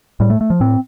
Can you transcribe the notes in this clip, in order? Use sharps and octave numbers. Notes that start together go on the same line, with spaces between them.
A2 G3
A3
A3
F3
A2 C4